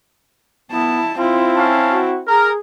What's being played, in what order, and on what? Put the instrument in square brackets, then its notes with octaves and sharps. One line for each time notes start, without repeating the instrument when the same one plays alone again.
[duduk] B3 [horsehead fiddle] E4 A5
[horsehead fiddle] C4 E4 [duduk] F4
[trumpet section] C#4 F5 A5
[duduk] F#4
[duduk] G#4 [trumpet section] A#4